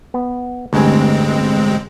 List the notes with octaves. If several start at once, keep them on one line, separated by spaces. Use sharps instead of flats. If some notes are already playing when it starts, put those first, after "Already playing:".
B3
A1 D2 G2 G#3 C4 G#5